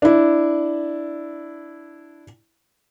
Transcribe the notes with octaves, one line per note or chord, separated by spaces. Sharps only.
D4 E4